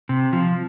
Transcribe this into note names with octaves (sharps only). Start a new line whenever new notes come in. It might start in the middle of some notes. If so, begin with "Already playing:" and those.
C3
F3